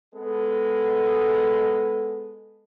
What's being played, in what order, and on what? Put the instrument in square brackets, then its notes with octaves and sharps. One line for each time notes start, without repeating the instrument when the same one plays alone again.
[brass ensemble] G#3 B3 A4